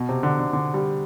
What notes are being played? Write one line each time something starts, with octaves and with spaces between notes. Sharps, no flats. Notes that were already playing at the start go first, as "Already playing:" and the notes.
Already playing: B2
C3
D3
D3
D3
G3